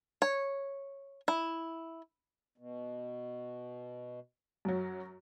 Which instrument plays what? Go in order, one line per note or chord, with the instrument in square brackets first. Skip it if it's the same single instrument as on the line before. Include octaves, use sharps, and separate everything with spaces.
[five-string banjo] C#5
E4
[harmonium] B2
[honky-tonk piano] F#2 F#3